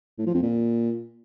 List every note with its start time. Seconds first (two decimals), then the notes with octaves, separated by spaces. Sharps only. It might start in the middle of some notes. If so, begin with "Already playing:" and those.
0.18 A2
0.26 F3
0.34 F2
0.42 A#2